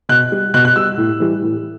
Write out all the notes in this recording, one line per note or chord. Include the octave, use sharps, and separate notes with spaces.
B2 F#6
G3
B2 F#6
F#6
G3 E6
A2
E3 G3
A2